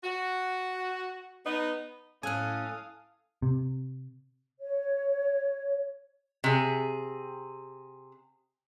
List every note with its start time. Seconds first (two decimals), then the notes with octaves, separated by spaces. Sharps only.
0.04 F#4
1.46 B3 D#4
2.23 A2 C#4 A4 F5 G#5 D#6 F#6
3.42 C3
4.60 C#5
6.44 C3 G#4